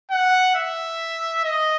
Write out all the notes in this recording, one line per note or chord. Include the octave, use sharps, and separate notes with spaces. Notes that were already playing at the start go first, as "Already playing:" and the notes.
F#5
E5
D#5